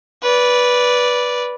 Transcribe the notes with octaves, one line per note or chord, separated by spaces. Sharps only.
B4 D5